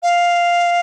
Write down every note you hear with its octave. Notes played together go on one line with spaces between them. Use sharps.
F5